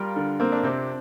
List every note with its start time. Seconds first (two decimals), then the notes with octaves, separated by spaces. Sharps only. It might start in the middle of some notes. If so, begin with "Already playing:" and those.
Already playing: G3 F4 A#4
0.16 D3
0.40 A#3 C4
0.52 D4
0.63 C3 C4